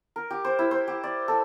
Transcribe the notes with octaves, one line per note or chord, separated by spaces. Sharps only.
A#4
G4
C5
E4
C5
G4
D5
A4